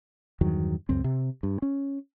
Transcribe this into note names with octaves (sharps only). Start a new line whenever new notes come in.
E2 G2 D#3 F#3
C#2 F#2 C4
C3
G2
C#4